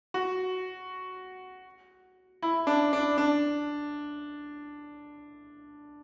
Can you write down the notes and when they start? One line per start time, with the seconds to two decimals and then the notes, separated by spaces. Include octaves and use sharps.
0.14 F#4
2.42 E4
2.67 D4
2.93 D4
3.18 D4